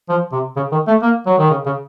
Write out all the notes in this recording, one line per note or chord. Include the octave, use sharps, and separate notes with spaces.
F3
C3
C#3
D#3
A3
A#3
F#3
D#3
C#3
C#3